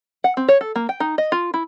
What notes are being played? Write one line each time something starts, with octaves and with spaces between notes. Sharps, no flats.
F#5
C4
C#5
A4
A#3
G5
D#4
D#5
F4
E4